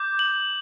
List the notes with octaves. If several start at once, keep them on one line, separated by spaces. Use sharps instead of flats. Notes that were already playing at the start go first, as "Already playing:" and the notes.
Already playing: D6 G6
F#7